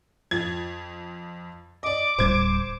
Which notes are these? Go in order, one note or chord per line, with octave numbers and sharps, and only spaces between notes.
F2 G#6 A6
D5 D#5 D6
D1 A2 G3 C5 G#6